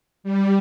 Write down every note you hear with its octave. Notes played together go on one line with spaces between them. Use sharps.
G3